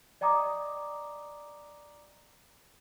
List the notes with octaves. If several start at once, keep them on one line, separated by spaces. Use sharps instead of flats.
D5 D#5 G5 A#5 D6 D#6